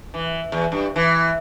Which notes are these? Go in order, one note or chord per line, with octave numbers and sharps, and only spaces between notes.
E3
E2
G2
E3